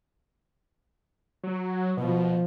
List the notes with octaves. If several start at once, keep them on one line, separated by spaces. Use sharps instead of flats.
F#3
B2 F3